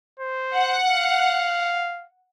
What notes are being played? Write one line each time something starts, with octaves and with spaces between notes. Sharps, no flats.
C5
F#5
F5